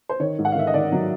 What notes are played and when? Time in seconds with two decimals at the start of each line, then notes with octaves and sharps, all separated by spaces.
0.09 C5
0.20 D#3 C#5
0.38 G#2
0.45 F#5
0.52 F5
0.55 D#3 E5
0.67 D#5
0.74 D#3 D5
0.92 F#3